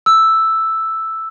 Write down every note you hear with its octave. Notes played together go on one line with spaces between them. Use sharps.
E6